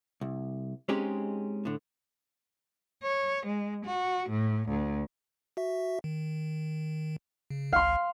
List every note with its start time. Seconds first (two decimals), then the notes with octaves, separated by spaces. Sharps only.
0.21 C2
0.89 G#3 C4 C#4 D#4 G4 G#4
1.65 A2 D3
3.02 C#5
3.46 G#3
3.85 F#4
4.30 A2
4.70 D2
5.57 F#4 E5
6.04 D#3
7.50 C#3
7.72 G#1 C#2 F5 C6